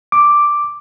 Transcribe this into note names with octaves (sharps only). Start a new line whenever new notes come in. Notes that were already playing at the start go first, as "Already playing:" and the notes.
D6